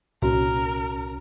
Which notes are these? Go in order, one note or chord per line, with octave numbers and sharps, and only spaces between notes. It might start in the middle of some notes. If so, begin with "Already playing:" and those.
C2 A#2 C#4 F#4 A#4